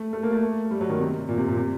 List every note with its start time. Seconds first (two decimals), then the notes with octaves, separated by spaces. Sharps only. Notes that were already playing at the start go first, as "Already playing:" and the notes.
Already playing: A3
0.13 A3
0.23 A#3
0.32 A3
0.71 G3
0.81 F#3
0.90 D#3
1.00 C3
1.29 A#2
1.38 C3
1.48 A#2
1.57 C3